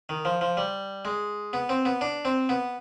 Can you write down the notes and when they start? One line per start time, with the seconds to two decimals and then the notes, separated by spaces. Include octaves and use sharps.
0.09 D#3
0.25 F3
0.41 F3
0.57 G3
1.05 G#3
1.53 B3
1.69 C4
1.85 B3
2.01 D4
2.25 C4
2.49 B3